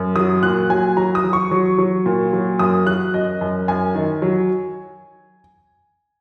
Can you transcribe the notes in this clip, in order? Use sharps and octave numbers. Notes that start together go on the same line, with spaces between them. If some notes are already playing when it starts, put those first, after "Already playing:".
Already playing: F#2
F#3 D#6
A#2 F#6
F#3 G#5
F#3 A#5
D#6
F#3
C#6
F#3
F#3
A#2
F#3
F#2 D#6
F#3 F#6
F#2 D#5
F#2
F#2 G#5
D#3
F#3